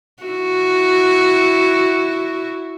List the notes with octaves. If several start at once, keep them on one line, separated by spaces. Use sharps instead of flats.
E4 F#4